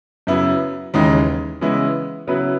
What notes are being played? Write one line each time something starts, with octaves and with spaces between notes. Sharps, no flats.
F#2 C#3 F#3 B3 E4
D#2 C#3 E3 G#3 D#4
C#3 E3 G#3 B3 E4
C#3 F#3 B3 E4 B4